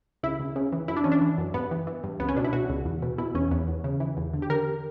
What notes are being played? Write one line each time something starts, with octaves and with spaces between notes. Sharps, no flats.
C#2 E4
C#2
C#3
E3
F#2 E4
D4
E3 C#4
D4
E3
F#2
G2 B3
E3
E3
G2
C#2 B3
C#4
B2 D4
E4
B2 F#4
C#2
E2
B2
B2 E4
E2 C#4
E2 B3
E2
C#3
E3
E2
D3
G4
D3 A#4